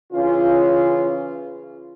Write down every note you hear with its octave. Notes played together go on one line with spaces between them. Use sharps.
C#3 E3 C#4 F4